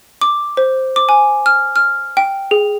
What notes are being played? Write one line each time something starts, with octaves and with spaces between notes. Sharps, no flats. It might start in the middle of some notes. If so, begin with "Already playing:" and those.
D6
C5
D6
G#5
F6
F6
G5
G#4